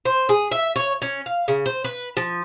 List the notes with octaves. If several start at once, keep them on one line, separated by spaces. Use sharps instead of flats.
C5
G#4
E5
C#5
C#4
F5
C#3
C5
B4
F3